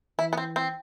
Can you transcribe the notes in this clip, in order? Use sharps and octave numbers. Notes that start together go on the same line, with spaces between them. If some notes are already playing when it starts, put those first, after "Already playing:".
E3 E4
B3
C4
C4